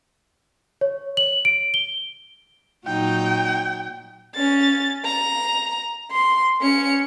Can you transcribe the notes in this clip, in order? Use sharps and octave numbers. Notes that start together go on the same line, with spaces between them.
C#5
F#7
D7
G7
A#2 F#3 D#4 G5
C#4 A6
A#5
C6
C#4 C#7